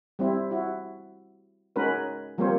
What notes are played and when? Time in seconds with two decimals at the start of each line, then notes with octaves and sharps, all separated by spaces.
0.19 G3 C4 E4
0.51 E4 F#4
1.76 G#3 C#4 D#4 F#4 A#4 B4
2.38 F3 G3 A#3 C4 C5 C#5